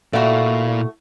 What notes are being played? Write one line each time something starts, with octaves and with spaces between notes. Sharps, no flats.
A#2 A3 E4 F#4 D5 F5